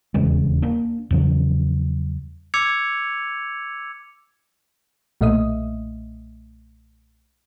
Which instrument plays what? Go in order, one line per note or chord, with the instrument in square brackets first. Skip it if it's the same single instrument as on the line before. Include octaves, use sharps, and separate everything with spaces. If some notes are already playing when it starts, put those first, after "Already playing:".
[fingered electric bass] D#1 E2 C#3 G#3
A#3 D4
E2 C#3 F3 F#3
[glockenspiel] D6 E6 G#6 C#7 F7
[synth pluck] B1 A#2 A3 D#5 E5 D#6